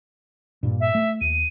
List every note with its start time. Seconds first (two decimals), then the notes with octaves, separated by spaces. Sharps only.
0.63 G2 A#2
0.80 E5
0.95 A3
1.21 D#2 D#7